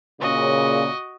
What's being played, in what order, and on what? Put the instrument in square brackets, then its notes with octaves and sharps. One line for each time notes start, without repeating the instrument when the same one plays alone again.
[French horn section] A#2 C#3 [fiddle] F#4 D#5